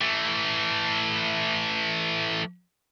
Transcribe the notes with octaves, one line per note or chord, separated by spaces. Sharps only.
E3 A3